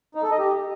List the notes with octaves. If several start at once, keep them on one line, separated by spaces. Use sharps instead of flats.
D#4
A4
D#5
G4